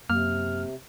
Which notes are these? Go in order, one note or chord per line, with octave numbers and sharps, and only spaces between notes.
F#2 C3 A#3 F6